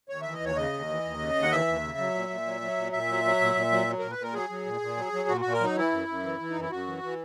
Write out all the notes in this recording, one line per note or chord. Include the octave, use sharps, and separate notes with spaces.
D#2 C#5
E3 E5
D#5
D#2 C#5
C#3 D#5
D#2
E3
D#2
C#3
D#2
F#5
E3 E5
D#2
C#3
F#3
A#2
A#2
F#3
F#3
A#2
A#2 E5
F#3
F#3
A#2
A#2
F#3
F#3
A#2 A#4
B4
A#2 A#4
F#3 G#4
F#3
A#2
A#2
F#3
F#3
A#2 F#4
A#2 F#4
A#4
F#3 D#4
E3 E4
F#2
F#2
E3
E3
F#2 D#4
E4
F#2 F#4
E3
E3